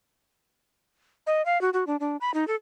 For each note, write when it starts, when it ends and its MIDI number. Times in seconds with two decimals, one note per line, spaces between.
1.27 1.44 75
1.46 1.60 77
1.61 1.70 66
1.73 1.84 66
1.87 1.96 62
2.00 2.17 62
2.21 2.33 83
2.34 2.47 63
2.48 2.55 69